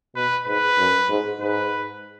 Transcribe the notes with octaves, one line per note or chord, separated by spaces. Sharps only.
B2 B4
G#2 B4
F#2
G#2
G#2 B4